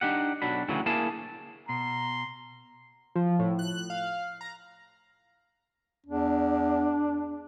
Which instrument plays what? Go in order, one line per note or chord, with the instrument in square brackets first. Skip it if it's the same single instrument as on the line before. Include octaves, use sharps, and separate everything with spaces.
[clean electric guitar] D4 D#4 G4 F#5
B1 F#3 D4 B5
D2 A2 C#3 E3 F#3
A#3 E4 G#4 A5
[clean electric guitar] B2 [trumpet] A#5 [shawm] C6
[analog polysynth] F3
A2
F#6
F5
A#5
[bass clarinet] E2 [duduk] D4